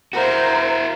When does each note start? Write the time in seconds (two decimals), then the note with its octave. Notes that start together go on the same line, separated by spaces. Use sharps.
0.13 E4 F#4 A#4 C5